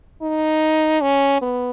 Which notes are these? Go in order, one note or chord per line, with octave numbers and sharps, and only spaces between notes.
D#4
C#4
B3